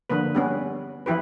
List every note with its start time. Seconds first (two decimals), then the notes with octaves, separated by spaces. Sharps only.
0.10 D3 F3 A#3 B4
0.35 G3 B3 C#4
1.06 E3 F3 E4 G4 B4